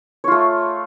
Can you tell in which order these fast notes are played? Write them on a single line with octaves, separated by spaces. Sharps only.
C#5 F4 A3